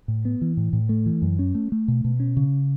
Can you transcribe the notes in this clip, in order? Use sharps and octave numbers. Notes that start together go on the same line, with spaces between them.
A2
B3
E3
A2
A2
A3
E3
F#2
C#4
A3
A3
B2
B2
C#4
C#3